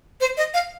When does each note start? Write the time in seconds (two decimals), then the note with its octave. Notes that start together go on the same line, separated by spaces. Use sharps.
0.21 C5
0.37 D#5
0.54 F5